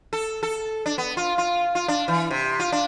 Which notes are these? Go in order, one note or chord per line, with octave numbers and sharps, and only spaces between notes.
A4
A4
D4
B3
F4
F4
F4
D4
E3
C3
F4
D4